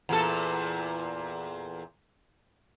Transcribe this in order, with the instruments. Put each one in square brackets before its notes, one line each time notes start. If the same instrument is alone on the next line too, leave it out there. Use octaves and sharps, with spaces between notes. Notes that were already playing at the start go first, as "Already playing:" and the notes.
[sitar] E2 A#2 A4